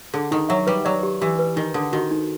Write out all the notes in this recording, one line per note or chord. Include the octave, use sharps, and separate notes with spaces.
D3 G#4
D#3 D#4
F#3 E5
G3 B4
F#3 D5
G4
E3 G4
B4
D#3 D#4
D3 A4
D#3 F#4
D#4